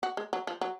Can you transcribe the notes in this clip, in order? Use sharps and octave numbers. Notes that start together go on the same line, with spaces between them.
F#4
G#3
F#3
F3
F#3